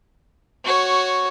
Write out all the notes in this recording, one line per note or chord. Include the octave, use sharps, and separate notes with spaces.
F#4 C#5